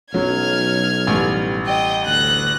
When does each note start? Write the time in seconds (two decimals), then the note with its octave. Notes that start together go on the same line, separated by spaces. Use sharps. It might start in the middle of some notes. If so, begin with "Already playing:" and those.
0.14 B1 F#3 C#4 F6 G#6
1.07 A1 G3
1.66 D#5 G5
2.06 D2 F#6 A#6